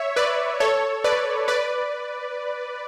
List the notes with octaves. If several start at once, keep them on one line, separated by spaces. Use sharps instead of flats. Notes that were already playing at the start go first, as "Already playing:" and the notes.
Already playing: C#5 E5
B4 D5
A4 C#5
B4 D5
B4 D5